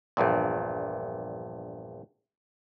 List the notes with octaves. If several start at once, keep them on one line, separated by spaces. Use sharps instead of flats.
A#1 E2 G2 A#2